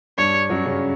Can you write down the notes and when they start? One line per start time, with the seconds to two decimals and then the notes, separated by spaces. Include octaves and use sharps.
0.18 G2 G3 C#5
0.50 F#2 F#3
0.65 C#3 C#4